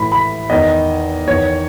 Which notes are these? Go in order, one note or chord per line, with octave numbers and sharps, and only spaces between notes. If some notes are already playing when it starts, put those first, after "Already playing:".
Already playing: A2 E3 B5
B5
E2 D#3 D#5
E2 D#3 C#5